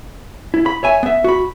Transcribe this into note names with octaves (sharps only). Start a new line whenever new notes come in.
E4
B5
C#5 E5 G#5
B3 E5
F#4 B5